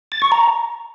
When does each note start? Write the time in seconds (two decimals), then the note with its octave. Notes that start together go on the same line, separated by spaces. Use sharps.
0.12 A6
0.22 C#6
0.32 A#5